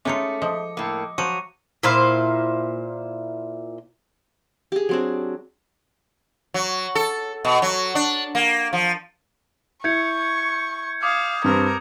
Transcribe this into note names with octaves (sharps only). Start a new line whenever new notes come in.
G#3 A3 C#4 D#4 F4 D6 C#7
F3 D#5
A2 A#3 D6
F3 F#3 C#6 C#7 D#7
A#2 E4 C5 F5
G4 G#4
F#3 C4 D4
F#3
A4
B2
F#3
D4
A#3
F3
E4 C#6 G6 G#6 C#7
F5 D6 D#6 G#6
G2 C4 A#4